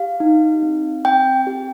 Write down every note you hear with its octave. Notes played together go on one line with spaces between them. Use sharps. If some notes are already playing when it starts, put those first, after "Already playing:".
Already playing: G4 F5
D#4
C4
C4 G5
G4